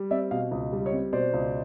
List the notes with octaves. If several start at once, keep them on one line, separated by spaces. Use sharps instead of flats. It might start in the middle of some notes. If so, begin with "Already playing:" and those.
Already playing: G3
C4 D5 E5
B2 D#5 F5
C#2
G3
C#5 D#5
C4
B2 C5 D5
C#2